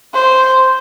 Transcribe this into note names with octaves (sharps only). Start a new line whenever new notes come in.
C5